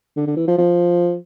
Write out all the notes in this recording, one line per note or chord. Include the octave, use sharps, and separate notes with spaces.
D3
D3
E3
F3
F3